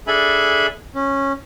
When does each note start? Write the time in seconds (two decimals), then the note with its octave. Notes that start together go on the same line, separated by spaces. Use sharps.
0.07 D4 G#4 A4 E5 G#5 B5
0.95 C#4